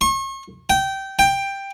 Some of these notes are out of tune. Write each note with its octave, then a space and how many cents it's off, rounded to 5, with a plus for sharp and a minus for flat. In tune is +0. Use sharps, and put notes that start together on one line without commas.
C#6 -40
G5 -15
G5 +10